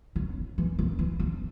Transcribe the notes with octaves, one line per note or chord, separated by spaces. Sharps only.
C#3
E3
C#3
E3
C#3